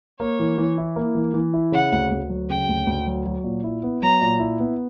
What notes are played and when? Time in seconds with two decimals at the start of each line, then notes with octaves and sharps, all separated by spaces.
0.20 A#3 C#5
0.40 E3
0.58 E3
0.78 E4
0.96 A#3
1.15 E3
1.34 E3
1.53 E4
1.72 C#3 F#5
1.92 D2
2.11 D2
2.30 F#3
2.50 C#3 G5
2.69 D2
2.87 D2
3.07 F#3
3.26 F#3
3.44 A#2
3.64 E4
3.83 B3
4.02 F#3 A#5
4.22 A#2
4.39 E4
4.60 B3